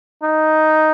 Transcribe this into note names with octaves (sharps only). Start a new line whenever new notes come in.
D#4